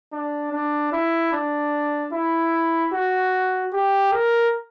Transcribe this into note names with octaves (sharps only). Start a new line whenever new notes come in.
D4
D4
E4
D4
E4
F#4
G4
A#4